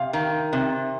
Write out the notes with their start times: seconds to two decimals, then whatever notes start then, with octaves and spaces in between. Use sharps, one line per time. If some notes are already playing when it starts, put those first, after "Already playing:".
Already playing: C3 F5
0.13 D#3
0.53 C3